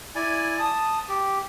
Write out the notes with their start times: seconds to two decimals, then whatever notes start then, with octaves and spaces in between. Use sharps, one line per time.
0.15 E4 D5 G#5
0.59 A5 D#6
1.08 G4